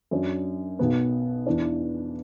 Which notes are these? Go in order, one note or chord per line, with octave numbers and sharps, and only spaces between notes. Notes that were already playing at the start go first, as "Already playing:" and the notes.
F#2 F#3 D4
B1 B2 B3
E2 E3 D4